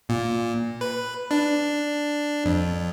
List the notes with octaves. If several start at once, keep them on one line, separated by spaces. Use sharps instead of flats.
A#2
B4
D4
F2